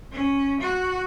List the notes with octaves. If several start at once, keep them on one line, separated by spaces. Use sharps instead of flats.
C#4
F#4